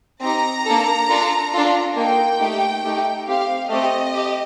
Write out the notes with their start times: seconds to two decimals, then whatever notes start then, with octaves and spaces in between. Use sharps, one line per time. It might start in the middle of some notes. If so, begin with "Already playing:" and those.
0.21 C4 D#4 G4 A#5
0.66 A#3 D4 A4
1.09 D4 F4 A4
1.53 D4 F4 A4
1.96 A#3 D#4 A4 G5
2.40 A3 D#4 G4
2.83 A3 D#4 G4
3.27 C4 G4 F5
3.70 A3 C4 G4 D#5
4.14 G4